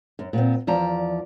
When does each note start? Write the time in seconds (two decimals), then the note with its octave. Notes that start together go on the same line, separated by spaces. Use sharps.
0.19 F#2
0.33 A#2 B3 C4
0.67 E2 F3 D5 A#5